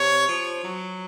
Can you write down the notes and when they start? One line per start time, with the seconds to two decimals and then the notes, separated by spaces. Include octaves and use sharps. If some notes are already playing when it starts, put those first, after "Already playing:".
Already playing: C3 C#5
0.29 F3
0.64 F#3